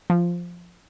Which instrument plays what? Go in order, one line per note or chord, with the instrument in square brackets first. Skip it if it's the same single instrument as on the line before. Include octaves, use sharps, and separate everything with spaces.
[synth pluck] F3